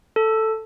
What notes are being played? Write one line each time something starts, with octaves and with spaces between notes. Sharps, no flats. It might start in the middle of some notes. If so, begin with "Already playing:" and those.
A4